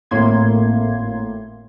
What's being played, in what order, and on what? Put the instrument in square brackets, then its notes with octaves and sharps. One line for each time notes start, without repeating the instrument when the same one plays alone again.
[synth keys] G#1 A2 A3 A#3 C6 G#6